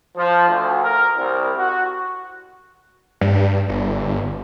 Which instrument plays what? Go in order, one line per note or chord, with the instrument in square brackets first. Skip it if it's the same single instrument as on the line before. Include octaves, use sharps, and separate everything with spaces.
[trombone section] F3
D2
A#4
C2
F#4
[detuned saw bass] G2
G1